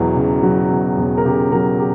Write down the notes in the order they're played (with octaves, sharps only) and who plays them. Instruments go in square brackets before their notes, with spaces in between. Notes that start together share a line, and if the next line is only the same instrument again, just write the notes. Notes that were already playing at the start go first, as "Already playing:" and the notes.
Already playing: [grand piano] E1 E2 F#3
C#3
F#3
E2
E1
A#4
C#3 G4
F#3 A#4
G4